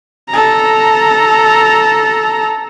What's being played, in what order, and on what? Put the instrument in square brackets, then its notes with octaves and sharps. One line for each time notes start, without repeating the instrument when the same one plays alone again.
[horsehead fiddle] A4 A#5